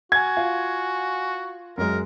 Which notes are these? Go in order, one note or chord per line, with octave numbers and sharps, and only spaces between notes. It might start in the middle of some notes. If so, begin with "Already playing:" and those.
F#4 F#5 G#5 G#6
F4
F#2 G#3 A#4